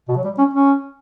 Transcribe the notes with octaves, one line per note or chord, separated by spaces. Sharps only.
B2
F#3
G3
C#4
C#4